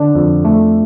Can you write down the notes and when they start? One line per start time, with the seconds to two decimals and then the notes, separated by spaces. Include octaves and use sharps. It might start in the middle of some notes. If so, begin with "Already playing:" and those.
Already playing: D3 D4
0.15 F2
0.45 A3